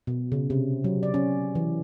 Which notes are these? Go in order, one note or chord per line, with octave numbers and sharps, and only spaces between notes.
B2
C#3
C3
F#3
D5
C#4
E3